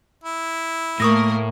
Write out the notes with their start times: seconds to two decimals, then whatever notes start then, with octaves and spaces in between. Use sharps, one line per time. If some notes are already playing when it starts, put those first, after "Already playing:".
0.24 E4
1.00 A2 A3 A#3 A#4 C#6 D#6 A#6